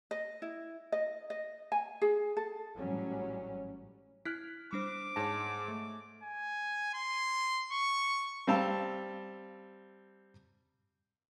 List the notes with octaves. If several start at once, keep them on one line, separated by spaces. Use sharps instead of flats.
D#5
E4
D#5
D#5
G#5
G#4
A4
A1 G#2 F#3 G3 C#4
E4 F6 F#6 B6
G3 D4 C5 D6
G#2 C#5 G#5 A5 A#6
A3
G#5
C6
C#6
G3 C4 F5 A5 E6